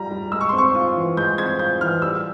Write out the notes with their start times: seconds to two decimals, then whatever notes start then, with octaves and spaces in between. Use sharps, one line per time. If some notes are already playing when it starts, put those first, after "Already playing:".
Already playing: G3 F4 A#5
0.11 G3
0.32 G#3 E6
0.41 C#6
0.49 C6
0.53 C4
0.58 C#6
0.75 F4
0.96 E3
1.17 G#3 G6
1.38 C4 G#6
1.59 F4 G6
1.81 E3 F6
2.02 G3 E6